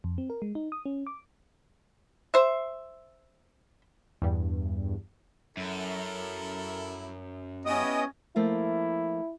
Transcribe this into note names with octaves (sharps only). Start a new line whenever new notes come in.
F2
C4
A#4
G#3
D#4
D#6
C#4
D6
C5 E5
E2 G2
F#2 E4 A4 A#4
B3 C#4 E4 G4 C#5 D#5 D#6
F3 A3 A#3 E4